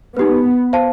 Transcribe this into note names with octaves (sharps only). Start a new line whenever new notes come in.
B3 D#4 G4 B4
C5 F5 A5